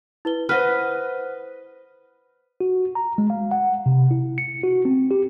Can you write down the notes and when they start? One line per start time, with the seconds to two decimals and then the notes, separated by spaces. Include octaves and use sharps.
0.25 E4 B4 G7
0.49 B4 C5 D#5 F#5 F6
2.61 F#4
2.95 A#5
3.18 G#3
3.30 F5
3.51 F#5
3.86 C3
4.11 E4
4.38 C#7
4.64 F#4
4.85 C4
5.11 G4